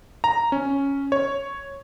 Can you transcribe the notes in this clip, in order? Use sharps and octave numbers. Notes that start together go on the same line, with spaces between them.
A#5
C#4
C#5